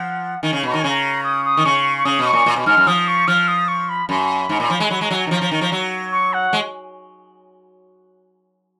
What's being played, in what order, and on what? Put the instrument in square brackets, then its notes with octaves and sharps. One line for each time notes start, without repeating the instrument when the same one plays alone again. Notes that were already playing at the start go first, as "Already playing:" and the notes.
Already playing: [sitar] F3 [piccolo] F#5
[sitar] D#3 [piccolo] G#5
[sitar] C#3
[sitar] B2 [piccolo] B5
[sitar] D#3 [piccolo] A#5
[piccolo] G#5
[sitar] C#3
[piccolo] A#5
D#6
D#6
[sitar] D#3
[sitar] C#3 [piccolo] C#6
[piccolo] C#6
[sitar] C#3 [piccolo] D#6
[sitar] B2
[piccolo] C#6
[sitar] A#2
A#2
B2
[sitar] G#2 [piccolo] F6
[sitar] F#2
[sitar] F3 [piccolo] D#6
[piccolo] C#6
[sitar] F3 [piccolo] F6
[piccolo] D#6
C#6
B5
[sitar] F#2 [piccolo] B5
[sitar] G#2
A#2
F3
G#3
[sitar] F#3 [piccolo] B5
[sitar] G#3 [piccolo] A#5
[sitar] F#3 [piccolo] G#5
[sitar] D#3 [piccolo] A#5
[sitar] F3
F3
D#3
F3
F#3
[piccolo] C#6
F#5
[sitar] G#3